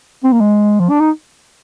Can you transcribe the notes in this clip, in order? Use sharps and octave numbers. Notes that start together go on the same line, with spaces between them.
C4
A#3
G#3
F3
D4
D#4